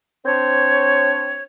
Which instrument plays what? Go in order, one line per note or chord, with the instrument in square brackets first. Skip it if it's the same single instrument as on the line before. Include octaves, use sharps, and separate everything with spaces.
[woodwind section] C4 D4 C5 C#5